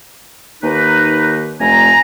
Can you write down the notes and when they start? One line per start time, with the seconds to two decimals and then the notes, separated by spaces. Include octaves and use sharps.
0.63 D#2 D#4 B4
1.60 F1 G#5 A#5